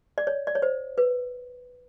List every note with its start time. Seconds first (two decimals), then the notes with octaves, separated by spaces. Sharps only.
0.18 D5
0.27 C#5
0.47 D5
0.55 C#5
0.62 C5
0.98 B4